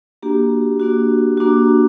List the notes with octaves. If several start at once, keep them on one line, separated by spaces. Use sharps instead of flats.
A#3 D4 F#4 G4
A#3 D4 F#4
A#3 D4 F#4